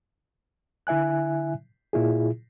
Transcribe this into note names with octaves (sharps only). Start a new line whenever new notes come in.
D3 E4 E5 G#5 F#6
A#2 E4 F4 G#4